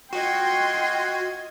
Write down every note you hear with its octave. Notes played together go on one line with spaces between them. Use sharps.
F4 F#4 D#5 G5 C6 G#6